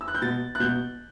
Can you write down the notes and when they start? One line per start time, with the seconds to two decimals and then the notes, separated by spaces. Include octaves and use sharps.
0.01 E6
0.08 F#6
0.15 G6
0.22 B2 A6
0.55 F#6
0.60 B2 G6